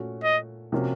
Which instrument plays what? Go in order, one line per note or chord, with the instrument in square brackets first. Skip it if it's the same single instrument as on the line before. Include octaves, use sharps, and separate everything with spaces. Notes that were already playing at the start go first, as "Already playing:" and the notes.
Already playing: [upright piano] A#2 A3 C#4 F#4
[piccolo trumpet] D#5
[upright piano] C3 F3 A#3 C#4 F#4